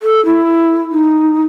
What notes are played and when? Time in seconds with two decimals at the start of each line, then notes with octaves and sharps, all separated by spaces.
0.02 A4
0.25 E4
0.91 D#4